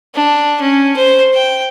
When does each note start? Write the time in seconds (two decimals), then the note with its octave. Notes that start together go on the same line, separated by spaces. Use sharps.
0.15 D4
0.61 C#4
0.96 C5
1.35 G5